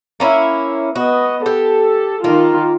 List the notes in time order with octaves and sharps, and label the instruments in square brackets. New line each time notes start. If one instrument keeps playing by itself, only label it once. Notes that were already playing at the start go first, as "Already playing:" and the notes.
[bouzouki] A#3 C#4 E4
[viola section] B3 D#5 [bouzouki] F#4
[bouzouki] G4 [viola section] A4
[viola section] D#3 F4 [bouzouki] A#3